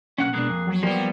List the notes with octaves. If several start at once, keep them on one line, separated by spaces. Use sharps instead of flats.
B1 G#2 A#3 C#4 F#5 F#6
B2 G#3 A#3 D4 G#4 F#6
F2
F#3
F3 G3 A#3 B3 G4